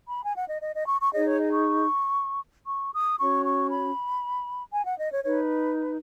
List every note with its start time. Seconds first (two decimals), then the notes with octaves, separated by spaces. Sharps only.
0.10 B5
0.23 G#5
0.36 F#5
0.49 D#5
0.62 D#5
0.75 D#5
0.88 C#6
1.00 C#6
1.13 D#4 G#4 C#5 D#5
1.25 C#5
1.38 D#5
1.52 C#6
2.68 C#6
2.93 D#6
3.19 C#4 F#4 C#5 C#6
3.45 C#6
3.70 B5
4.73 G#5
4.86 F#5
4.99 D#5
5.12 C#5
5.24 D#4 B4 C#5